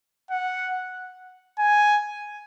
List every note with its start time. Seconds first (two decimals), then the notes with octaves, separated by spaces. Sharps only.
0.31 F#5
1.59 G#5